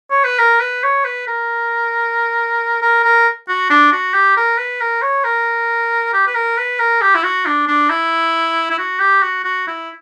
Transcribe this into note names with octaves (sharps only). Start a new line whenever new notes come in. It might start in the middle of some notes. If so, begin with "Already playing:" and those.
C#5
B4
A#4
B4
C#5
B4
A#4
A#4
A#4
F#4
D4
F#4
G4
A#4
B4
A#4
C#5
A#4
G4
B4
A#4
B4
A#4
G4
E4
F#4
D4
D4
E4
E4
F#4
G4
F#4
F#4
E4